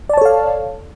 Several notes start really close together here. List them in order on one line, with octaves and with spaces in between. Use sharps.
D5 A5 C#5 A4 F5